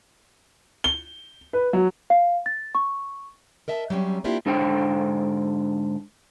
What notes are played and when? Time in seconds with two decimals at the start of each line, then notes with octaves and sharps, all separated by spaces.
0.84 G7
1.53 B4
1.73 F#3
2.10 F5
2.46 A6
2.75 C#6
3.68 A#4 D#5 E5 A5
3.90 F#3 G3 C4 C#4
4.24 A#3 C4 D4 E4 F4 G4
4.46 G#2 D3 D4 C5 G5